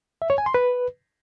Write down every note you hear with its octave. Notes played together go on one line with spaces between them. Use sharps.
E5
C#5
G#5
C6
B4